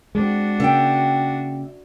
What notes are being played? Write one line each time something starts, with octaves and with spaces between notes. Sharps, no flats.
G#3 C4 D4 F#4
C#3 A#3 E5 G5